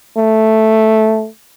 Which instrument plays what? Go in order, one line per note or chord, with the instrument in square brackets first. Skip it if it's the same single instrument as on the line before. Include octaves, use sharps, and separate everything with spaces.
[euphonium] A3